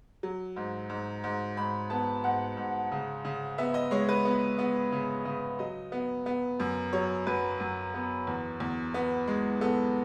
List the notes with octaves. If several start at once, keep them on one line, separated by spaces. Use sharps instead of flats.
F#3
G#2
G#2
G#2
G#2 B5
B3 A5
G#2 F#5
G#2
C#3
C#3
B3 E5
D#5
G#3 C#5
B4
B3
B3
C#3
C#3
F#3 D#5
B3
B3
F#2
F#3 C#5
F#2 B4
F#2
B3
E2
E2
B3
G#3
B3 A4